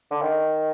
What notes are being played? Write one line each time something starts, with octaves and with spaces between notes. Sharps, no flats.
D3
D#3